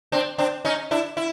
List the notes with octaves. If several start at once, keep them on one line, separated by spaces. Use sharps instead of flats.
C4 D4
C4 D4
C#4 D#4
D4 E4
E4